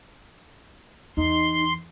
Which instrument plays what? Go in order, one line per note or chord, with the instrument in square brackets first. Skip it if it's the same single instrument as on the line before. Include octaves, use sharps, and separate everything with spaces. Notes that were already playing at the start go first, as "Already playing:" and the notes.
[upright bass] E2 [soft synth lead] D#4 [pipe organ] C6